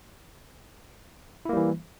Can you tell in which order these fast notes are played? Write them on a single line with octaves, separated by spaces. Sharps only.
E4 A#3 G3 E3